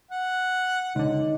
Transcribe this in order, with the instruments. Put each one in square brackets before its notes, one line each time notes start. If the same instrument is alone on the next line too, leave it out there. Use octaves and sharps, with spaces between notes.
[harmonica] F#5
[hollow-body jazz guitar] C#2 D3 [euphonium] D#4